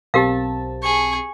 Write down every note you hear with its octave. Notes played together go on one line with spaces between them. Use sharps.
B1 C4 G4 A#4 F5 A5
G#4 C#6